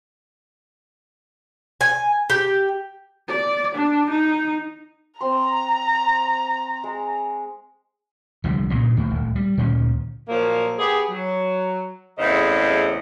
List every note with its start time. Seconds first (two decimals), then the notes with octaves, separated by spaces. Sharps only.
1.81 G#5
2.30 G4
3.29 D5
3.75 D4
4.10 D#4
5.21 C4 A#5 C6
6.84 G#3
8.44 C2 D3 F3 G3
8.70 G2 A#2 C#3
8.97 D2 A2 D#3
9.10 D1
9.36 G3
9.57 D2 A#2 D#3 C#4
10.28 A#2 F3 F#3 A#3
10.78 B3 G4 G#4
11.10 F#3
12.18 E2 A2 C#3 C4 D#5